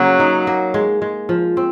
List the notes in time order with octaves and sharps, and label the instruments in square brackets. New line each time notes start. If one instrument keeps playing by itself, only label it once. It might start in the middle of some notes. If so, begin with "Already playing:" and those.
Already playing: [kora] C#3 A#3 [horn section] F#3
[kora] D#4
A#3
G#3
G#3
F3
C4